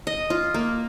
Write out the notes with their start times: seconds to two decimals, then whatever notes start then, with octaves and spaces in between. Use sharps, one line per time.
0.07 D#5
0.30 F4
0.54 A#3